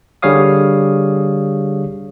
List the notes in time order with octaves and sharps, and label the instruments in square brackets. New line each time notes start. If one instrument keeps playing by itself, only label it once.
[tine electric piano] D3 G3 G#4 C#5 F5 D#6